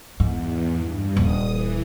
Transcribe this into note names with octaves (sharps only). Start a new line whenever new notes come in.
E2 G#2
G2
D#1 D#6
E3